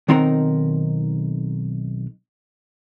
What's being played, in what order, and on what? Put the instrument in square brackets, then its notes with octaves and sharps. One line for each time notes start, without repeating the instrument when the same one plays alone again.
[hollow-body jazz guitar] B1 D#3 C4 D#4 A#4 F#5